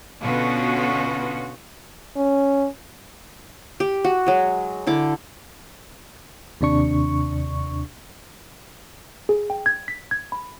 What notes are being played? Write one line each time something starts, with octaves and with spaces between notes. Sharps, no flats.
B2 D3 B3 C#4 F4 F#4
C#4
G4
F#4
F#3 G#3
D3 E4 D6
D#2 C3 D4 C#6
G#4
G5
G#6
B6
G#6
B5